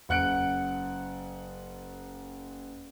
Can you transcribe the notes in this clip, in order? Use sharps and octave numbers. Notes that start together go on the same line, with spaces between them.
F#1 F#5 F#6 C#7 D7